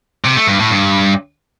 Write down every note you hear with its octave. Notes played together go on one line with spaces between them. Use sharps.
C3
A3
G2
A2
G2